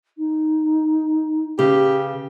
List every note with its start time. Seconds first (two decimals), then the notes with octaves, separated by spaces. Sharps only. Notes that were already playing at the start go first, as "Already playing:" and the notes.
0.18 D#4
1.59 C#3 G4 B4